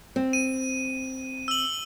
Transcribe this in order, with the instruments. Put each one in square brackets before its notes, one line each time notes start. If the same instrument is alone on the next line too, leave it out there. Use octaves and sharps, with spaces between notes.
[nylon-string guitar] C4
[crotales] D#7
E6 F#7